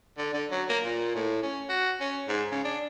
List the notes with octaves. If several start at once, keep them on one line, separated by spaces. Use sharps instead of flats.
D3
D3
F#3
A#3
A#2
A2
C#4
F#4
C#4
G#2
C#3
D4